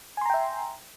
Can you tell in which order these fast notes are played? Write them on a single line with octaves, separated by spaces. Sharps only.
G#5 C6 A#5 G5 E5